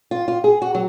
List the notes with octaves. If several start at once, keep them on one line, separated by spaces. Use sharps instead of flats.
F4
F4
G#4
F#4
F#3